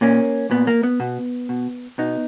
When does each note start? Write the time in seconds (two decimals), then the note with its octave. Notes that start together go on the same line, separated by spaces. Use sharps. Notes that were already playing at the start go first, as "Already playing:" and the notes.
0.01 A#2 A#3 C#4
0.51 A#2 B3
0.67 A#3
0.83 B3
1.00 B2
1.49 B2
1.98 B2 B3 D#4